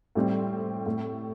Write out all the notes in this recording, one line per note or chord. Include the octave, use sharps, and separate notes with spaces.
A2 G3 C4
A2